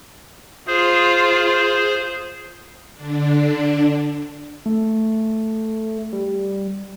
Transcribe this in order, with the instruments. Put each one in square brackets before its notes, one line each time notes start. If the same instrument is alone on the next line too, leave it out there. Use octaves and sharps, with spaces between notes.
[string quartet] F4 [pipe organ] G#4 C5
[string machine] D3 D4
[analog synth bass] A3
G3